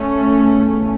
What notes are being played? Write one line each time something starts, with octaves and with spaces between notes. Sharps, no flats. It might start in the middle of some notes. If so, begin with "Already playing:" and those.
Already playing: A3 C#4
E2 C#3